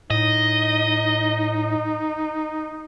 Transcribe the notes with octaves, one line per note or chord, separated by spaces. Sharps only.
A2 D#4 D#5